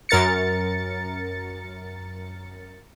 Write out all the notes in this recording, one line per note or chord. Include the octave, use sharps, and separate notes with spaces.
F#2 A#4 A6 C#7